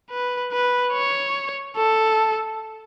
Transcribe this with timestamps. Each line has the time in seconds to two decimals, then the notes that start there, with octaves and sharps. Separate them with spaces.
0.10 B4
0.52 B4
0.93 C#5
1.76 A4